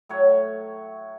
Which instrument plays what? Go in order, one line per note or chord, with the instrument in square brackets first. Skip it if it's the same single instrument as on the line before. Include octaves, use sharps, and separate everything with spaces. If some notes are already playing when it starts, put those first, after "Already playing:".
[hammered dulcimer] A2 F#3 C#5 F#5